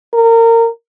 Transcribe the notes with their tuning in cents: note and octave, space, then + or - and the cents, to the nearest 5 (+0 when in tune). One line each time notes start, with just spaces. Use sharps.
A#4 -25